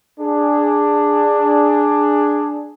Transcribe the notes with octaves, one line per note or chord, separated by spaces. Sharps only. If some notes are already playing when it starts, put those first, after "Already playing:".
D4 G#4